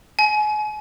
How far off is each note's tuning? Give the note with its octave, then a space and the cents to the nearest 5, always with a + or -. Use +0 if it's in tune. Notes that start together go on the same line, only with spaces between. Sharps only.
G#5 +35